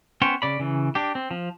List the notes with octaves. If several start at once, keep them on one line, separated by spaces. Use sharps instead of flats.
B3 C#4 C5 C#5 G5
C#3 D5 B5
C#3 E3
D4 G4
C4
F3